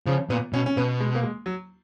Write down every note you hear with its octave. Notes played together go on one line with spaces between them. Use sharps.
C#3 F3
A#2 B3
B2 C#4
C#4
B2 B3
G#3
A#3
G#3
F#3